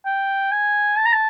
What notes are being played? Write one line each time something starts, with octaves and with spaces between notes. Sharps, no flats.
G5
G#5
A5
A#5
A5